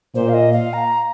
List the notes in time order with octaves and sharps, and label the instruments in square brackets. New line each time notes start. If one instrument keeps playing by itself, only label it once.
[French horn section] A#2 [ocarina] C5
[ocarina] F5
D#5
F5
A#5